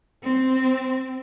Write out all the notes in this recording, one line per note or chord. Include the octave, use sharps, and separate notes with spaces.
C4